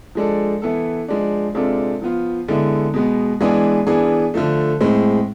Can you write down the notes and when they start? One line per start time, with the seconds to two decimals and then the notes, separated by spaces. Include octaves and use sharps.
0.15 F3 G#3 D4 A4
0.62 E3 B3 E4 A4
1.08 F3 G#3 D4
1.55 C3 G#3 D4 F4 A4
2.02 F3 B3 F4
2.48 D3 G#3 B3 E4
2.94 B2 G#3 B3
3.41 E3 G#3 B3 D4 G#4
3.87 E3 B3 D4 G#4
4.34 D3 F3 A3
4.81 A2 G#3 C4